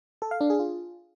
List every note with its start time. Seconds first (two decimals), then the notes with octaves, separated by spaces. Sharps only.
0.22 A4
0.31 F5
0.41 D4
0.50 G#4
0.59 F4